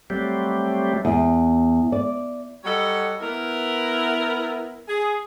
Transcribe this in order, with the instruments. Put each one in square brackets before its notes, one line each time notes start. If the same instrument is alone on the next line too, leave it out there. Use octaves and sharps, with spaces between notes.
[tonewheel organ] F#3 G3 A3 C4 G4
[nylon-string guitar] E2
D5
[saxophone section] F#3 G3 A4 C#5 D#5 F#5
B3 E4 A#4
G#4